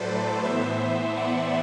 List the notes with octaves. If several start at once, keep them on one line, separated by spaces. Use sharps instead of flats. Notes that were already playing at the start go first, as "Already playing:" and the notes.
Already playing: A2 F#3 A3 A4 B4 C5 D5
A2 E3 B3 C5 E5
D5 F#5